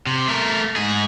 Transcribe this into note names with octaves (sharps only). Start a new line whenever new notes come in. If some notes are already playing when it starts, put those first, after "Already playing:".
C3
A3 A#4
G#2 G#4